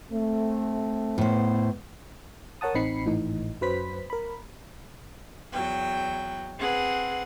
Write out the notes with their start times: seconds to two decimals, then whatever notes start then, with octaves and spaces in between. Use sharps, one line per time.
0.11 A3 C4
1.18 A2 B3 C5
2.61 A#4 C#5 F#5 A5 D#6
2.75 A1 C4 D#4 B5 C7 C#7
3.06 G#1 A2 E3 D#4
3.61 F#2 F#3 B4 C5 B5 B6
4.10 A#4 B5
5.52 E2 F#3 G5
6.58 C4 G#4 B4 F#5